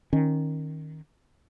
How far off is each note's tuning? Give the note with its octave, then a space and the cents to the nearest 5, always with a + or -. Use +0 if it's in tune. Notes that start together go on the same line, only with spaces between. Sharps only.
D#3 +0 C#4 -20